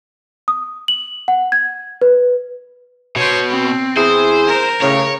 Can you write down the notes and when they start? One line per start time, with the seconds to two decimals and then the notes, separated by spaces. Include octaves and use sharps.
0.48 D#6
0.88 F#7
1.28 F#5
1.52 G#6
2.02 B4
3.16 B2 C5 C#5
3.50 C4
3.97 E2 E4 G#4 C5
4.47 A#4
4.81 A2 C#3 C#5